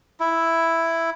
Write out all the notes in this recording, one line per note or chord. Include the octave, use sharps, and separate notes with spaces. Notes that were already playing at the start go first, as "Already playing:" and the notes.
E4